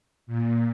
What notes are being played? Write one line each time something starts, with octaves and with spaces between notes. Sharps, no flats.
A#2